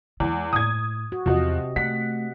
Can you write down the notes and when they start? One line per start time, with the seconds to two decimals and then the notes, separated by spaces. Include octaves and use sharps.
0.20 E2 G#3
0.53 A2 D#6 G#6
1.12 F#4
1.26 E2 C3 F3 F#4 D#5
1.76 A3 F#5 B6